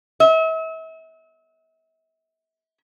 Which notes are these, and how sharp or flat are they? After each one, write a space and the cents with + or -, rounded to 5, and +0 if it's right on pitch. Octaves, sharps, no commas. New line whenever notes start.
E5 -40